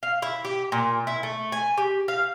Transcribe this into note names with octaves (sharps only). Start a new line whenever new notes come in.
F5
E4
G4
A#2
E4
A3
G#5
G4
F5